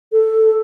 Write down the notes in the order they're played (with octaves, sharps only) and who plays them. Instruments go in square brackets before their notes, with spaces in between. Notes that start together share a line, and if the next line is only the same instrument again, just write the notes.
[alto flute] A4